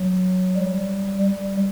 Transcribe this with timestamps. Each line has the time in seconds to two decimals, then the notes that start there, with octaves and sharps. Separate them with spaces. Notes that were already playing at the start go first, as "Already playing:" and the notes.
Already playing: F#3
0.57 G3
1.23 G3